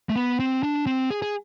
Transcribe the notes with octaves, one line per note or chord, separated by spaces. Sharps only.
A3
B3
C4
D4
C4
G#4
G#4